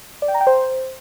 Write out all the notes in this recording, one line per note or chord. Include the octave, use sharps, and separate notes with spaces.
D5
G5
A#5
G5
C5